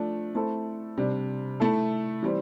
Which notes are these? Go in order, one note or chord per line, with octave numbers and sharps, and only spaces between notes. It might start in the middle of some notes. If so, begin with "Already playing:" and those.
Already playing: F3 A3 D4
A3 C4 E4 A4
C3 G3 D4
A3 E4 A4
E3 G3 C4